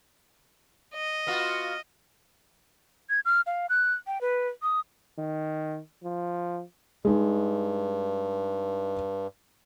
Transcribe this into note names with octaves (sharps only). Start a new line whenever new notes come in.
D#5
B3 F4 F#4
G#6
F6
F5
F#6
G5
B4
D#6
D#3
F3
G2 G#3 D#4